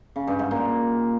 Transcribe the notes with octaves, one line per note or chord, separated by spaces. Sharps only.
C#3
G2
G#2
A#2